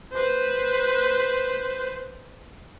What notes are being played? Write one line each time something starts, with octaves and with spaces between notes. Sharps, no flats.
B4 C5